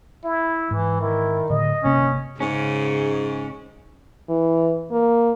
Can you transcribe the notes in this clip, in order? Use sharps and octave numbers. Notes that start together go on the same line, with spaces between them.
E4
G#2 E3
D#3 E4
A2 D3 D#5
G1 C3 A#3 C#4
G#2 C#3 C#4
E3
A#3